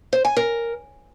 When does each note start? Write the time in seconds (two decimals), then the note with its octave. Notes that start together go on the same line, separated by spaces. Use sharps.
0.13 C5
0.25 G#5
0.37 A#4